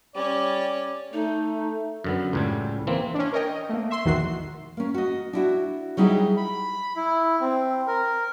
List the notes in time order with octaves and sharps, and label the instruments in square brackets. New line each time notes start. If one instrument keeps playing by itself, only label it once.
[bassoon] G3 [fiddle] C#4 C#5 [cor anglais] D5
[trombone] A3 [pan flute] D#4
[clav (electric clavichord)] F#2 D3 B3
C#2 A2 G3
E3 A#3 C4
[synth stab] C#4 D4
A#4 C#5 D#5 G5
D#5
A3 A#3
E5 C6
B1 E2 D#3 F#4 C7
[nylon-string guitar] A#3 C#4
F#4 D#5
D4 E4 F#4
F#3 G3 D#4 E4 G4 G#4
[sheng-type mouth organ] B5
E4
C4
A#4